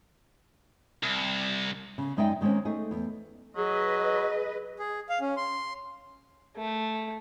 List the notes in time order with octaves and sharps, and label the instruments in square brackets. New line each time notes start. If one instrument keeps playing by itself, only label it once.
[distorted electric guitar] C2
[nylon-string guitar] C#3
F#2 G#3 D#4 D5 E5 G5
D#3 G#3 A#3 C4 C#4
A3 D#4 G#4
E2
[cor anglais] F#3 [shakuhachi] G#4 [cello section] B4 D#5
[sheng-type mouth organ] G#4
F5
C#4
C6
[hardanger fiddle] A3